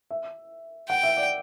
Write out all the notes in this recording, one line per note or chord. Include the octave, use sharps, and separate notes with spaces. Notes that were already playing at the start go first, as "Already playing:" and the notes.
E5
F#5 G5
E5
D5